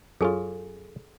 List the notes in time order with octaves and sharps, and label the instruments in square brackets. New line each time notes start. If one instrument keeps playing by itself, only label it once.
[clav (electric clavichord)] F#2 C#4 F4 [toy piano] G#4 A4 G#5